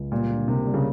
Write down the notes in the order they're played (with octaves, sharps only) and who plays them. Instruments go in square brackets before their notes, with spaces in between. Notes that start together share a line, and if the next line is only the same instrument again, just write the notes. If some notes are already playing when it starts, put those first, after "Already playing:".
Already playing: [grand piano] C#2
[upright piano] A#2 [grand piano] G3
[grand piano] D3
[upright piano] C3 [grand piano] A#3
[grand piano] G3
[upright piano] C#3